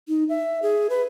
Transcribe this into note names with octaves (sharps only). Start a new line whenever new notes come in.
D#4
E5
G#4
B4